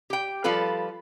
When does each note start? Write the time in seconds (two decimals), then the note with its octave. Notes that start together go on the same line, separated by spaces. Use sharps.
0.10 G4 G5
0.44 F3 G3 F4 A4 B4